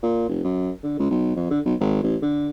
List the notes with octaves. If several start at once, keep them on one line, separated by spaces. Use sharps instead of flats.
A#2
F1
F#2
D3
C#2
B1
F2
D3
B1
G#1
A1
D3